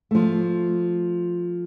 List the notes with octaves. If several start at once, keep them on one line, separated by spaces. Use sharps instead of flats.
F3 A3